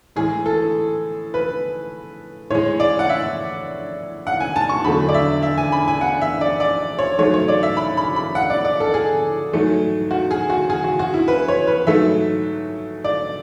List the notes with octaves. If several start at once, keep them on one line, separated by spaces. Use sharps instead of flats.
A2 E3 G#3 G#4
A4
B4
A2 G#3 C#5
D5
F#5
E5
F#5
G#5
A5
C#6
E2 D3 F#3 A3 B5
D5
E5
E5
G#5
B5
G#5
F#5
E5
D5
D5
C#5
G#2 F#3 A3 C#5
C#5
D5
E5
B5
B5
B5
F#5
D5
D5
A4
G#4
G#2 F#3 A3
F#4
G#4
F#4
G#4
F#4
F#4
E4
B4
C#5
B4
G#2 F#3 A3 E5
D5